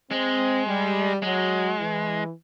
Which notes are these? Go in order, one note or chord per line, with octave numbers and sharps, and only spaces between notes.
G#3 C4
G3
F#3 G#3
E3